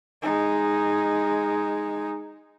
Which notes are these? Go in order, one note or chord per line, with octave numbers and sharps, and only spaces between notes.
G#3 D#4